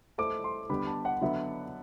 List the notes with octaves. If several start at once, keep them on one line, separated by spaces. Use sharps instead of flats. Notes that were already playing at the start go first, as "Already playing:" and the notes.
A3 E4 A4 C5 D6
C6
D3 G3 B3 B5
A5
F#5
D3 F#3 B3 E5